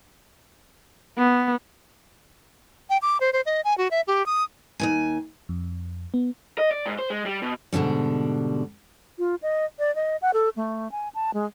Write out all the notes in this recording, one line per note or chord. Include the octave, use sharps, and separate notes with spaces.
B3
G5
D6
C5
C5
D#5
G#5
F#4
E5
G4
D#6
D#2 G#2 G#5
F2
B3
D#5
D5
G#2
C5
G#3
G3
B2
G#2 B2 D3 D#3 G3
F4
D#5
D5
D#5
F#5
A4
A3
G#5
A5
G#3